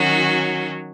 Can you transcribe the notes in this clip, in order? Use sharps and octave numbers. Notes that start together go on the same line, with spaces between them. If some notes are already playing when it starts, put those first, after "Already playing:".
Already playing: D#3 F#3 C#4 F#4